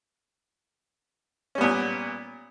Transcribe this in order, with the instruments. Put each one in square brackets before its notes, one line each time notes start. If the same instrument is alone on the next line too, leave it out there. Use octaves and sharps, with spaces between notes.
[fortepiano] C#4
G3
B3
A#2